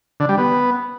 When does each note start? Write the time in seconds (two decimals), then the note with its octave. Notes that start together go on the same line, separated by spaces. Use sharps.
0.20 D3
0.29 G3
0.38 B3